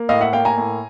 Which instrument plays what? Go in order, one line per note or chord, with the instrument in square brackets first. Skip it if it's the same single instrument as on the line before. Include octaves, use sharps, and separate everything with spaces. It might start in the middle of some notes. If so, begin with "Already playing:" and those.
Already playing: [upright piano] A#3
A2 D#5 F5
E5 F#5
A#3 F5 G5
G#5 A#5
A2